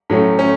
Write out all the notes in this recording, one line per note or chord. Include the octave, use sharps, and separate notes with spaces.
A2 F#3 A3 C#4
A3 C#4